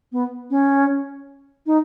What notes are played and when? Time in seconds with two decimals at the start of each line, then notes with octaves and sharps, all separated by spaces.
0.12 B3
0.50 C#4
1.66 D#4